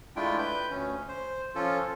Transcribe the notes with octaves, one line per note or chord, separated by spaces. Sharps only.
G#3 A3 D4 E4 F4 G5
B4 G6
D2 C#4
C5
F3 C#4 F4 A4